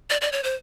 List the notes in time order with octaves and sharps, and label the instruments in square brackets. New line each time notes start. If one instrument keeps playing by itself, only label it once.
[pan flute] D5
D5
C#5
C5